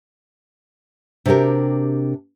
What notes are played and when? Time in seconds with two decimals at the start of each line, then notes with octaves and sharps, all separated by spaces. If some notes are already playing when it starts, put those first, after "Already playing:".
1.26 C3 D4 F#4 G4 A#4